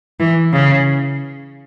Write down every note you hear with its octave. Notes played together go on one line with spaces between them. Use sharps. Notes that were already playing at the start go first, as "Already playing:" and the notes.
E3
C#3